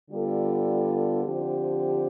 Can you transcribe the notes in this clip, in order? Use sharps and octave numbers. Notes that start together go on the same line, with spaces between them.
D3 G3 B3 F4 A4
D3 F3 C4 G4